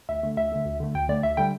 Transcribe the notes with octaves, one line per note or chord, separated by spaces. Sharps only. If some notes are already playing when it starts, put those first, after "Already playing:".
D2 E5
D3 A3
D2 E5
D3 A3
D2
D3 A3
D2 G5
D3 A3 D5
D2 E5
D3 G3 G5